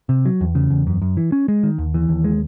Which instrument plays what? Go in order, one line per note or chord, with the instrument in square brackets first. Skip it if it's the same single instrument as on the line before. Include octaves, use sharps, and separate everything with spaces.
[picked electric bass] C3
F#3
E2
C#3
E2
F#2
F#2
E3
C#4
G#3
D#3
D#2
E3
D#2
G#3